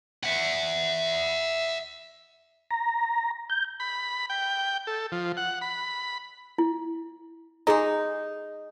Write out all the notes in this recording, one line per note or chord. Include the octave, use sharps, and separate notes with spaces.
E5 F#5
A#5
G6
B5
G5
A4
F3
F#5
B5
E4
G#3 D#4 G4 G#4 A#5